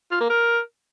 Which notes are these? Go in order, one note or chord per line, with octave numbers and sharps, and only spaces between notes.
F4
A#3
A#4